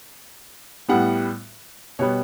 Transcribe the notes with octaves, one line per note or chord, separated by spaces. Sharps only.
A2 G3 B3 F#5
B2 G3 B3 C#5